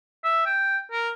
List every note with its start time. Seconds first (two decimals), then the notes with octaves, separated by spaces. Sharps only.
0.24 E5
0.46 G5
0.91 A#4